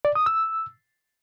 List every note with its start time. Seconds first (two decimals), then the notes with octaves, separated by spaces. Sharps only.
0.05 D5
0.15 D#6
0.26 E6